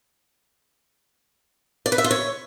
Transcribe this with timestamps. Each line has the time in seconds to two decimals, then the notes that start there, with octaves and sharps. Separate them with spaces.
1.86 D5
1.92 B4
1.98 E5
2.04 F4
2.11 C#5